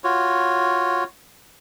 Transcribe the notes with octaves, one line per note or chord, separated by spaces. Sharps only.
F4 F#4 C#5